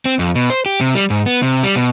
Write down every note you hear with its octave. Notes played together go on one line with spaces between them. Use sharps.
C4
F2
B2
C5
G4
C3
G3
G#2
B3
C3
G3
B2